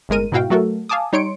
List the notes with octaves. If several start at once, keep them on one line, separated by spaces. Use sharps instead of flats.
G1 A2 G#3 A#4 D#7
G#2 B2 E4 F#4 F5 G5
F#3 A3 F#4 A4 A#4
F5 G#5 A5 D6 D#6
G3 D#4 C#5 C6 C#7 D7